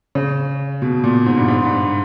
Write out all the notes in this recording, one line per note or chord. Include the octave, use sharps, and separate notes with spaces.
C#3
B2
A#2
G#2
G2
G#2
G2